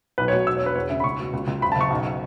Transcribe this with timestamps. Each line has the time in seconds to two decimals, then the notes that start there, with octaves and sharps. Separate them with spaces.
0.18 B1 B4
0.28 C#5
0.33 B2
0.47 E1 E6
0.57 C#5
0.61 E1
0.66 B4
0.75 E2 C#5
0.89 C#3 E5
1.00 B5
1.04 C#2 C#6
1.19 B2
1.33 C#2
1.47 C#2
1.61 F#1 B5
1.72 A5
1.76 F#1 C#6
1.90 B1